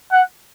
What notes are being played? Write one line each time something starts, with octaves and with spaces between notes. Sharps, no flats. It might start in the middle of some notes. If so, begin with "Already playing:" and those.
F#5